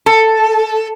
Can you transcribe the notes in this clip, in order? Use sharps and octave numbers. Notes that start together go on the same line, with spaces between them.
A4